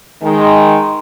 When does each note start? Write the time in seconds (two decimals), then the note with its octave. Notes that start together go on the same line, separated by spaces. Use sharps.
0.23 D#3 G#3